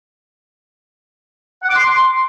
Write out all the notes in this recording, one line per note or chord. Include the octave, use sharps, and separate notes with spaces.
F#5
D6
C6